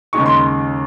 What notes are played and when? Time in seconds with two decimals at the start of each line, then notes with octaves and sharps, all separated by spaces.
0.13 D#2 C#3 G#3 D#4 C#6
0.26 C6